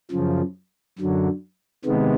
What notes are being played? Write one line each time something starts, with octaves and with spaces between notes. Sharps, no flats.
F#2 C#3 F3
F#2 D3 F#3
C3 D#3 G#3 B3